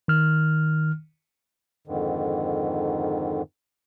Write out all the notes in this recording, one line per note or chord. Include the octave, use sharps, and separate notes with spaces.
D#3 F6
F2 G#2 D3 D#3